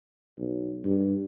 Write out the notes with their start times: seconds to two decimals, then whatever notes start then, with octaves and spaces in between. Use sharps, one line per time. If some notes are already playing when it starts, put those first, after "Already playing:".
0.38 B1
0.84 G2